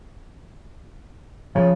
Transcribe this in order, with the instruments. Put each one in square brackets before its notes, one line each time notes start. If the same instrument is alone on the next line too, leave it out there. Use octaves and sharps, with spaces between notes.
[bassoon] C#3 [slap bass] F3